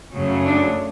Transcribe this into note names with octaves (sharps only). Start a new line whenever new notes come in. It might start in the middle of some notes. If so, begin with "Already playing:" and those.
F#2 C#3 F#3 A3
D4